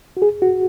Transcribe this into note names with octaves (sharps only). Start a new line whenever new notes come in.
F#4
G#4
F#4